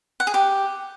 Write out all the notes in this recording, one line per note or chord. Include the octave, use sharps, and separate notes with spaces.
F#5
G#4
G4